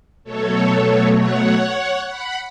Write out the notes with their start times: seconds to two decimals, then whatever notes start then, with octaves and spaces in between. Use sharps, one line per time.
0.24 B2 F#3 A3 A4 C#5
1.15 C#5 F#5
2.06 F#5 B5